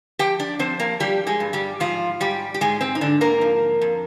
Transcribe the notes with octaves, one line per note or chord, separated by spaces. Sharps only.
F3 G4 G5
D4 D5
F3 C4 C5
A#3 A#4
F3 G3 G4
G#3 G#4
G2
G3 G4
G#2 F3 F4
G#2 G3 G4
G4
G#2 G#3 G#4
C4
D#4
G#2 D3 D4
A#3 A#4
F3
F2